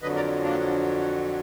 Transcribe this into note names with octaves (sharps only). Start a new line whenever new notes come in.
F2 D3 F#3 B4 D#5
A#4 D5
A#3 D4